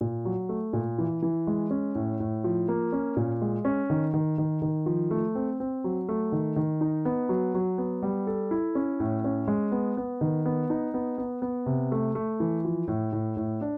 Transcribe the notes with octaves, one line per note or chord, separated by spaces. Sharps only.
A#2
F#3
A3
A#2
E3
E3
G#3
C#4
A2
A2
F3
A#3
C#4
A#2
G#3
C#4
D#3
D#3
D#3
D#3
F3
A3
C4
C4
F#3
A3
D#3
D#3
D#4
B3
F#3
F#3
B3
G3
A4
E4
C#4
A2
C#4
G#3
B3
B3
D#3
B3
D#4
B3
B3
B3
C3
A3
A3
E3
F3
A2
A2
A2
D4